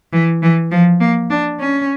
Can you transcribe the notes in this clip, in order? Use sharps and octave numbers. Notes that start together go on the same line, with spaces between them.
E3
E3
F3
A#3
D4
C#4